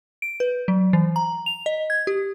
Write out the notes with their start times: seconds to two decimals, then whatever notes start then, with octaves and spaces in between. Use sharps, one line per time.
0.22 D7
0.40 B4
0.68 F#3
0.93 E3
1.16 A#5
1.46 F7
1.66 D#5
1.90 G#6
2.07 G4